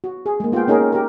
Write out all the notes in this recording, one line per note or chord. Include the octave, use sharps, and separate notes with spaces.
F#4
G#4
G#3 A#3
B3 F4 G4 G#4 G5
A#3 C#4 D#4 G#4 A#4
G4 A#4